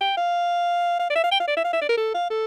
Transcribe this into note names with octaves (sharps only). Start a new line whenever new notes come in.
G5
F5
F5
D5
E5
F5
G5
F5
D5
E5
F5
E5
D5
A#4
A4
F5
A4